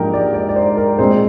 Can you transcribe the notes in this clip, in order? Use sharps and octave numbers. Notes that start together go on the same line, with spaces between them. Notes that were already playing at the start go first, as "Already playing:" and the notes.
Already playing: G#2 F3 A#3 D4 G4 A#4
D5
D5
D5
C5
A#4
A#2 G#3 C4 C5